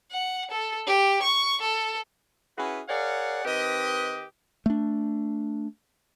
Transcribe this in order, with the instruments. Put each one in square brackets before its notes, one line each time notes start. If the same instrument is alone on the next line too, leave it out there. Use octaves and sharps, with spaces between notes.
[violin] F#5
A4
G4
C#6
A4
[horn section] C#4 E4 F#4 G#4 B4
G#4 A#4 C#5 D5 F5 F#5
D#3 C4 G4 B4 D#5
[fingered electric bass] A3 D4